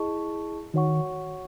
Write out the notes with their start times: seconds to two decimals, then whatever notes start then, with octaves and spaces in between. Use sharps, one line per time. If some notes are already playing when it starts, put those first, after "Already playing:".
Already playing: E4 G#4 D#5 A5 C#6
0.74 D#3 F#4 C#5 F#5 C#6